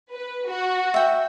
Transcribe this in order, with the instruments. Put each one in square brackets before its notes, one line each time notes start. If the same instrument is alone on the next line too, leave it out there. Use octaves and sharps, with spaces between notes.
[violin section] B4
F#4
[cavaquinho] E5 G5